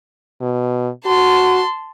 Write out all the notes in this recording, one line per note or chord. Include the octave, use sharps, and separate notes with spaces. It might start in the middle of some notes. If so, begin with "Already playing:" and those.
B2
F#4 A5 C6